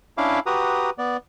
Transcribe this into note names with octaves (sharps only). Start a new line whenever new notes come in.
C#4 D4 E4 F5 B5 D6
F#4 G4 B4 A#5 D#6
B3 D5